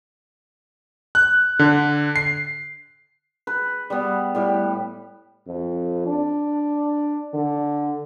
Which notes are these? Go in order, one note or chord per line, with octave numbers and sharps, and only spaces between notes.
F#6
D3
C7
B4
G3 B3
A2 G3
F2
D4
D3